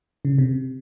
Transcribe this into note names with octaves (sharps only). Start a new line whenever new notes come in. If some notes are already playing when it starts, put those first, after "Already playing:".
C#3
C3